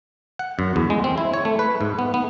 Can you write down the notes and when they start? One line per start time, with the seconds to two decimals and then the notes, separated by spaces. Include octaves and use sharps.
0.39 F#5
0.59 F#2
0.76 E2
0.90 G#3
1.04 C4
1.18 E4
1.34 C#5
1.45 A3
1.59 B4
1.81 G#2
1.99 B3
2.14 B3